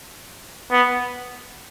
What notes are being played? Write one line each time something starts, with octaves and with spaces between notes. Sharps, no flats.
B3